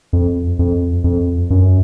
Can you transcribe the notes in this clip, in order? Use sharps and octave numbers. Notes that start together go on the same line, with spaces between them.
F2
F2
F2
F#2